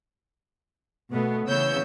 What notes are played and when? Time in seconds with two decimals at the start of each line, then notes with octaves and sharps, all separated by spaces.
1.11 B2 A3 B3
1.47 C#3 E3 B3 C#5 E6 G6